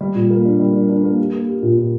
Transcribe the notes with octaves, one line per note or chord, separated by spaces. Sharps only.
G3
A#2
A#3
D4
G3
D4
D4
A#3
G4
A#3
G4
A#2
A#2